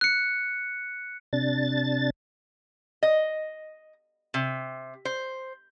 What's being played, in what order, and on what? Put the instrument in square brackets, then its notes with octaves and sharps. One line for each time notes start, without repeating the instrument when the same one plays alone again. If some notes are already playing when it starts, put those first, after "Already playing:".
[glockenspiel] F#6 C#7
[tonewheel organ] C3 D4 A6
[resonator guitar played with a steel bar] D#5
C3
C5